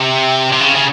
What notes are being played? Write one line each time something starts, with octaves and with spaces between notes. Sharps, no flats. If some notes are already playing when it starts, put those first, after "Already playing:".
Already playing: C3
C3
C#3
C#3